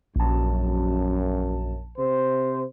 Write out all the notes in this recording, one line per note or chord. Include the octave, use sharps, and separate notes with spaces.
A#1 F#2 A5
C3 C5